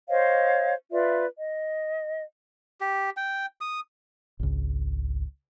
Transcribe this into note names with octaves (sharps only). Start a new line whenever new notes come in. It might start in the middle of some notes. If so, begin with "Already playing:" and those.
C5 C#5 D#5 F5
F4 B4 D5 E5
D#5
G4
G5
D#6
G#1 C#2